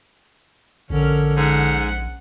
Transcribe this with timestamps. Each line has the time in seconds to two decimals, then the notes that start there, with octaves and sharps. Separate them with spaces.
0.90 A#1 D3 C#4 A#4
1.37 G#2 F#5